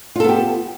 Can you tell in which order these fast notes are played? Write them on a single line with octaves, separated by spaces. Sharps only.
F4 A4 B3 G4